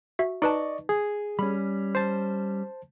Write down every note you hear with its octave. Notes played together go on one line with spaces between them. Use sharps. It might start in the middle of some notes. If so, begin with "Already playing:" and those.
F#4 E5
D#4 B4 D5 D#5 A5 C#6
G#4
G3 C#4 B5
C5 A5